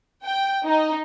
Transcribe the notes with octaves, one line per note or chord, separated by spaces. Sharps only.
G5
D#4